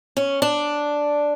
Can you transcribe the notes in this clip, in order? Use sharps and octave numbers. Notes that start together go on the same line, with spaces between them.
C#4
D4